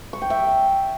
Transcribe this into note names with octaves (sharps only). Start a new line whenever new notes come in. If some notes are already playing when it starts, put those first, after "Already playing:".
C#6
G5
E5